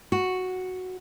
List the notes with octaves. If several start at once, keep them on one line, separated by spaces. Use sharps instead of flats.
F#4